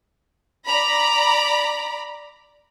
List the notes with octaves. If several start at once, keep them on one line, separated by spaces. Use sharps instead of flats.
D5 A#5 B5